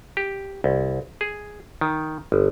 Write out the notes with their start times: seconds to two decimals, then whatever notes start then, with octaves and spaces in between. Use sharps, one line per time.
0.17 G4
0.64 C2
1.21 G#4
1.81 D#3
2.32 G1